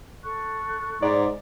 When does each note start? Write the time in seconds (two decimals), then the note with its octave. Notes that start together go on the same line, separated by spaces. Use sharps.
0.23 A4 C#6 F#6
1.02 G#2 D5